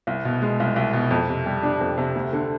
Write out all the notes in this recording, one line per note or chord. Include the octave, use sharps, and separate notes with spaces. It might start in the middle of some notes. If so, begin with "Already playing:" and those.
C2
B2
G#3
C2
C2
B2
F2
C3
G3
D4
F2
C3
D2
D3